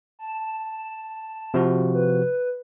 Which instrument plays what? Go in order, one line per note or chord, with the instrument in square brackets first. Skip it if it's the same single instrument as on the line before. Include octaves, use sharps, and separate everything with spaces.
[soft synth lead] A5
[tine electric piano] C3 F3 F#4
[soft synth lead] B4